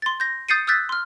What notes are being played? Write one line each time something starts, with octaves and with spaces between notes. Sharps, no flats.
C6 A6
G6 A#6
D#6 G6 A6 C7 C#7 D#7
D#6 E6 F#6 G6 A6 B6
C6 F6